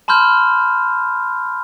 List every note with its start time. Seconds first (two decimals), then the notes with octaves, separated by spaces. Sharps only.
0.08 A5 B5 C6 F6 G6